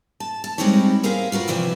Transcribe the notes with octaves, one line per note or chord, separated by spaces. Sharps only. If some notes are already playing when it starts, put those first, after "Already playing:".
A5
A5
G3 G#3 C4 D#4 E4 C#5
G#4 A#4 C5 E5 F5
F4 F#4 A#4 B4
C3 E3 F3 D5 E5